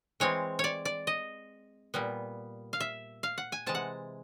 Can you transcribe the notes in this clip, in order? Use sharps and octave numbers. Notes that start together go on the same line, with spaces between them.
E3 G#3 C4 C#5
C#5 D5
D5
D#5
A#2 G3 B3
F5
E5
F5
F#5
G#5
C3 E3 G#3 A5
F#5